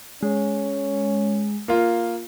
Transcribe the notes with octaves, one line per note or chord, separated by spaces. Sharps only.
G#3 C#4
A#3 F4